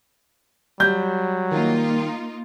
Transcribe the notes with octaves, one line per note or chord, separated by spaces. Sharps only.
F#3 G3 G6
D#3 A#3 D#4 F4